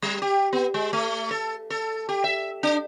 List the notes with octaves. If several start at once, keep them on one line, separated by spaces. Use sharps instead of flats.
G3
G4
B3
G#3
A3
A4
A4
G4
E5
D4